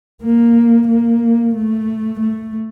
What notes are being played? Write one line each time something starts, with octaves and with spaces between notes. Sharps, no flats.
A#3
A#3
A3
A3